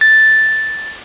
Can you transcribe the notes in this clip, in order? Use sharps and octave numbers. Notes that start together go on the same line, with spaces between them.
A6